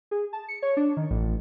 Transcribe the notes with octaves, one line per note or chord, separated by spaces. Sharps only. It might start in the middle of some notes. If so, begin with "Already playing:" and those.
G#4
A5
C#7
C#5
D4
D#3
A1